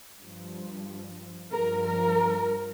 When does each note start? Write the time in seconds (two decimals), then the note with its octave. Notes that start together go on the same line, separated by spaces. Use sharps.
0.21 G2 F3
1.51 G2 F3 A#4
1.84 A#4